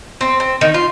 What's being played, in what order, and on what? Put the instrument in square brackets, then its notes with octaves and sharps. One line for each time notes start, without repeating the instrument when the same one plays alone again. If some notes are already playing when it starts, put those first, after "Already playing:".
[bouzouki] C4
C4
D#3
F4